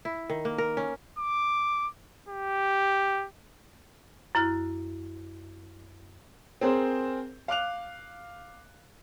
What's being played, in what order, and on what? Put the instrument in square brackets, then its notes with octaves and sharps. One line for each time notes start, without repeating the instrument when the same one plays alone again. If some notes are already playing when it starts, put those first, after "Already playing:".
[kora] E4
D#3
A#3
A#4
C#4
[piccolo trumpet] D6
G4
[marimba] F#2 E4 F6 F#6
[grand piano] C4 G#4 A#4 C5
F5 D6 F#6 F7